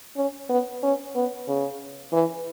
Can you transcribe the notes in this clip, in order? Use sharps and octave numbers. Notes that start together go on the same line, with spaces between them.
C#4
B3
C#4
B3
C#3
E3